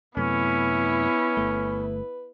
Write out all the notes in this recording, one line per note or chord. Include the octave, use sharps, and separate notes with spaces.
F#2 C3 A3 B3 C#4 E4 B4
G1 A3